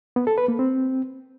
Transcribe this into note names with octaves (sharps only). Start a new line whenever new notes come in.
B3
A4
B4
A#3
C4